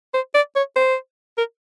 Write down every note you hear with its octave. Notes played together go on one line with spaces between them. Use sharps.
C5
D5
C#5
C5
A#4